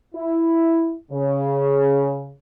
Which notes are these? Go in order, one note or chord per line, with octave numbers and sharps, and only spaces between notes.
E4
C#3